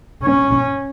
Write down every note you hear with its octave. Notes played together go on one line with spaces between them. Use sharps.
C#4